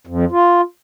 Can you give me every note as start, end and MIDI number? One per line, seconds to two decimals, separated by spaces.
0.07 0.25 41
0.32 0.61 65